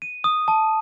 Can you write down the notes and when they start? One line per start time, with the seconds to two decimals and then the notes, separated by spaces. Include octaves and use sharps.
0.02 D#7
0.24 D#6
0.48 A5